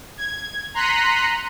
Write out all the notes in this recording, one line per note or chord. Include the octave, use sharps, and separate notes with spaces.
G#6
A#5 C6 F#6 B6 C#7 D#7